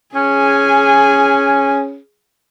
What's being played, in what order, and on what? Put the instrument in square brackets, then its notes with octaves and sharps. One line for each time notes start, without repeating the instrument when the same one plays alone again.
[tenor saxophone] C#4 [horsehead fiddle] G#4 G#5